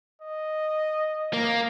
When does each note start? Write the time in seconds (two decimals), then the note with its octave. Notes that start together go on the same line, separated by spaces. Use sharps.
0.21 D#5
1.34 A#3